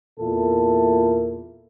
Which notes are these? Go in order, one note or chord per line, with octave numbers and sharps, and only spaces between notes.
E2 A#2 A#3 E4 A4